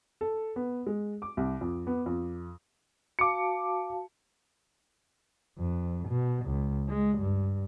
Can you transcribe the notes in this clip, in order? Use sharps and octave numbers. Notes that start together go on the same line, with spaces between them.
A4
B3
G#3
D6
C2
F2
B3
F2
F#4 F5 A5 D6 C#7
F2
B2
C#2
G#3
G2